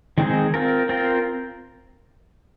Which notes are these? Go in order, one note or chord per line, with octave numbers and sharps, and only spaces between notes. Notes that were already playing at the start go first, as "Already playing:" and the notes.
D#3 G#3 C4 D#4 G#4
C4 F4 A#4
C4 F4 A#4